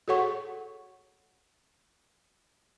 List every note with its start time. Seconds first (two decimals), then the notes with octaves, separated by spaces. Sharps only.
0.08 F#4 G#4 A4 C#5 F#5 C#6